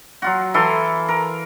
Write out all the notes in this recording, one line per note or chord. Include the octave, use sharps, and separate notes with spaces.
F#3 F4 F#4
E3 A4 F5 C6
A#4